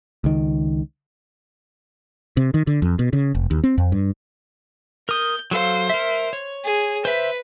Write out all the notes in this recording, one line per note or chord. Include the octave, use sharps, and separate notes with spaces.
C#2 D#3
C3
D#3
D3
F2
B2
C#3
F1
D#2
C4
F2
G2
A#4 D#6 G6
F#3 A4 C5 F5
A#4 E5
C#5
G#4
B4 C5 E5